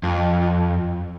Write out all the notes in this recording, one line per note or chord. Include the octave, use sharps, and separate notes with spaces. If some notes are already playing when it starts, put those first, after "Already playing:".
F2